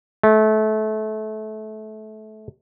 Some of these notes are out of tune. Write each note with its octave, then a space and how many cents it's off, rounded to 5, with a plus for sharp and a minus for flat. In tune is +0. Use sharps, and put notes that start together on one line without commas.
A3 -25